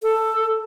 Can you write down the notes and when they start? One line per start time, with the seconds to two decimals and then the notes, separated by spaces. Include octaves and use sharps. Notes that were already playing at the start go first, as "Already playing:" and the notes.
0.03 A4